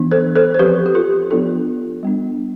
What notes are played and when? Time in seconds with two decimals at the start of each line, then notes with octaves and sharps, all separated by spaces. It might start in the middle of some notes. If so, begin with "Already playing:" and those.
Already playing: E3 B3 D4
0.11 A4 C5
0.36 A4 C5
0.54 C5
0.59 F3 C4 G4 B4
0.86 G4
0.95 F4 A4
1.31 F3 B3 D4 F4 A4
2.03 G3 B3 D4